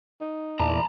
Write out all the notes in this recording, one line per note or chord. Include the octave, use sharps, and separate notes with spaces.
D#4
E2 A#2 E3 D5 A5 A#5